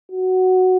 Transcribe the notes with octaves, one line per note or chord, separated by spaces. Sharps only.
F#4